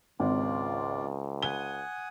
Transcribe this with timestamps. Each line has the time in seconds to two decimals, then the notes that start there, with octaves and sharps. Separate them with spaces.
0.20 G#1 C#2 F4 D5
1.42 F#5 G#5 D#6 G7